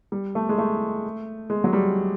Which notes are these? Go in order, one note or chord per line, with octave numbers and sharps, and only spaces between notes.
G3
A3
G#3
A3
G#3
F#3
G3